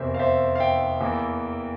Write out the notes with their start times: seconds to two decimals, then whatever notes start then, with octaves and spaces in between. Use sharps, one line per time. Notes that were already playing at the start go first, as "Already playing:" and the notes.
Already playing: F1 E2 C3 A#4 C5 E5
0.14 F5
0.19 C5 E5
0.55 F5
0.60 E5 G5
1.00 E2 E3 A#3